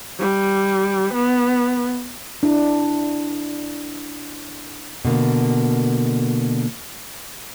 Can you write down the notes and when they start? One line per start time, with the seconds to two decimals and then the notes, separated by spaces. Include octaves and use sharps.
0.20 G3
1.14 B3
2.43 D4 E4
5.05 B2 D3 A#3